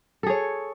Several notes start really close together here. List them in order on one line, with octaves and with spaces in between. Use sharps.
A4 G#4 C#5